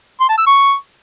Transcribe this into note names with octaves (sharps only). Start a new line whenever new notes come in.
C6
A5
E6
C#6